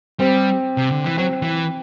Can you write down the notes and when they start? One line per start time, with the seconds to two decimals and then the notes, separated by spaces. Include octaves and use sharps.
0.19 G3 C4
0.77 C3
0.91 D3
1.04 E3
1.17 F#3 C4
1.42 E3 C4